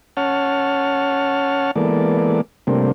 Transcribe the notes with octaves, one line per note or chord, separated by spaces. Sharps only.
C#4 C#5 F#5 A5 F6
E3 G#3 A#3 B3 A4 D5
C3 G3 A3 A#3 C4 D4